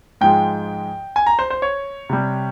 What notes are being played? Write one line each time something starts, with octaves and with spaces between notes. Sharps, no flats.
G#2 F3 G#3 G5
G#5
A#5
C5
C5
C#5
C3 G3